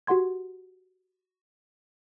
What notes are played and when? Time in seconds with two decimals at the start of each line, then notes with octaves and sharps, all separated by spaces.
0.07 F#4 G4 F#5 C6 G#6